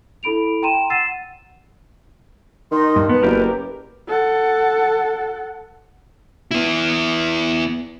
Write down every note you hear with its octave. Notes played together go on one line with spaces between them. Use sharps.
E4 A4 B5 D7 F7
G5 A#5 C6 D#7 E7
F#5 E6 A6 C7 D#7 E7
D#3 D#4 C6
G2
B3 B4 A5
F#1 G4 A#4
A4 F#5
B3 E4